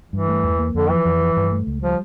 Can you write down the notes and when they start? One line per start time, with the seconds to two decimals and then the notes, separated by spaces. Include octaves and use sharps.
0.12 G2 E3
0.28 A3
0.44 E2
0.59 A#3
0.75 F2 D3
0.90 E3 F3
1.05 F2
1.21 F3
1.37 G2
1.52 A3
1.67 C#2
1.82 F3 G3